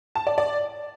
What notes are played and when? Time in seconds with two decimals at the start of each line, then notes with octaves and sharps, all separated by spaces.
0.15 A5
0.27 D5
0.38 D5